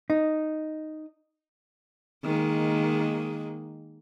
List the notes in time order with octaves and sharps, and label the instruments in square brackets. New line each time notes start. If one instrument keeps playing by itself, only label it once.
[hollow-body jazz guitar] D#4
[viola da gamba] D#3 G#3 A#3